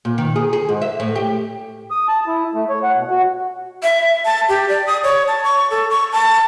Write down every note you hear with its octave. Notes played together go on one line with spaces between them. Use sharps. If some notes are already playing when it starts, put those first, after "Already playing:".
A#2
D#3
G#4
G#4
G#2
E5
A2
G4
D#6
A5
E4
A3
C#5
F#5
B2
F#4
E5
A5
G4
D5
D#6
C#5
A5
C#6
A4
C#6
A5